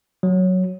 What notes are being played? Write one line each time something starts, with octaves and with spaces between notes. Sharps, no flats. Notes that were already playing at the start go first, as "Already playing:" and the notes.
F#3